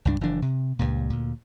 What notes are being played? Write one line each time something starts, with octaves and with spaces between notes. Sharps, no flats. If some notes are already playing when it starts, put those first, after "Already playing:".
C#2 G2 D4
F#1 E3 F3 D4
C3
C#2 G2 A#2
D2 A#2